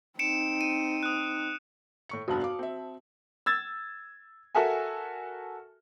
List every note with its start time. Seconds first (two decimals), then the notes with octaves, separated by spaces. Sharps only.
0.19 C4 D#4 C#7 D7 E7
0.61 D#7
1.03 D#6 F#6
2.09 A2 C#6 C#7
2.28 F1 G2 B3 F#4 A5
2.41 F5 D6
2.59 C4 E5
3.46 E6 G#6 A6
4.55 F#4 A4 A#4 E5 G#5